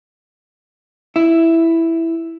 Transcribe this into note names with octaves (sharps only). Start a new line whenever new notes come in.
E4